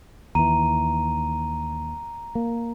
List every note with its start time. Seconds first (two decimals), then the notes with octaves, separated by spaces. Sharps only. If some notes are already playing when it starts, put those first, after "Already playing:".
0.35 D#2 E3 A#5 D#7
2.35 A#3